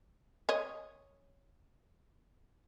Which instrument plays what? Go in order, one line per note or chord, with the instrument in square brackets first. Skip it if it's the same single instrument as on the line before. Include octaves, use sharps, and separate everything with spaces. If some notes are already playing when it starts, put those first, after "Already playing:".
[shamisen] C#5 D#5